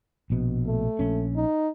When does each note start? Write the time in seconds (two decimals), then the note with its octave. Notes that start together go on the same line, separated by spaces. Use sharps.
0.30 A#1 B2
0.67 A3
0.99 A#1 C#4
1.36 D#4